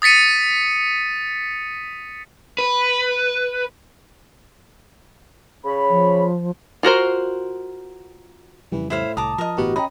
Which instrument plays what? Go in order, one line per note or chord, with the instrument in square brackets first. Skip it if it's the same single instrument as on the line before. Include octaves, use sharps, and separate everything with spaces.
[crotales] D#6 A6 B6 C#7 D#7
[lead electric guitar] B4
[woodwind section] C#3 C#5 B5
[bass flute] F3
[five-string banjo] F4 F#4 A#4 C5
[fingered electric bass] F2 C#3 G3 [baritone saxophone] E3
[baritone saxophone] A2 [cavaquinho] E4 C5 F5
[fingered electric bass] C2 [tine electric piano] A5 D#6 [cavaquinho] A#5 D6
[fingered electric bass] F3 [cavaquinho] A#4 D#5
[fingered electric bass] G1 A2 E3 [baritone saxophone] B3 [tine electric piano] F#4 G4
[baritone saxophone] C#4 [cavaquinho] D#5 [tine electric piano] G5 A#5 B5